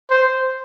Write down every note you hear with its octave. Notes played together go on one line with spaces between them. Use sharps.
C5